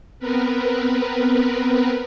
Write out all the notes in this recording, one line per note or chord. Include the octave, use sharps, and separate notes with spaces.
B3 C4 A#4 B4